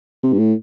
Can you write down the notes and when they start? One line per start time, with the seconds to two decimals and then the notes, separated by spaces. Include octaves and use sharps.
0.23 C3
0.33 G2
0.39 A2